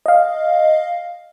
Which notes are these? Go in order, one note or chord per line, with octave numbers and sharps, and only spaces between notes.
D#5 F5